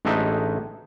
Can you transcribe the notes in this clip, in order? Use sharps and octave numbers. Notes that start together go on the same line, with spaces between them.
A1 G#3 A3 D4 D#4 E5